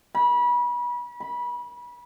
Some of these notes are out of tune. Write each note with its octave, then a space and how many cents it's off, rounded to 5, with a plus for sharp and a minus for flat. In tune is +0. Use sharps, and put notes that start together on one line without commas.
B5 -30
B5 +0